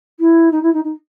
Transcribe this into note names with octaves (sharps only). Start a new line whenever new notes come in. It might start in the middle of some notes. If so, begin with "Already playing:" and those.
E4
D#4
E4
D#4
D#4